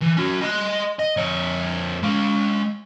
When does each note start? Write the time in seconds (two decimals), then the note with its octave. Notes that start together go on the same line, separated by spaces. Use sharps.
0.02 E3
0.17 C#4 F#4
0.42 D#5 C6
0.99 D#5
1.17 F2 C#5
2.03 G#3 F5